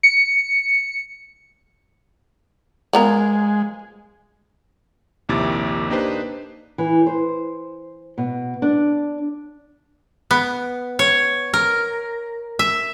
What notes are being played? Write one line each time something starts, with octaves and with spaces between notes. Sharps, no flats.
C#7
F3 G#3 B3 A#4
A#1 D#2 C3 E4 D6 A6
A#3 D4 D#4 G4 B4 C5
E3
C5
B2
D4
B3
C#5
A#4
E5